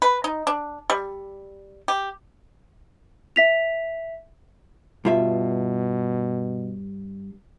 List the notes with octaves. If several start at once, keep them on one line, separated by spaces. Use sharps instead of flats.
B4
D#4
D4
G3
G4
E5 B6 F7
G2 B2 F4 E5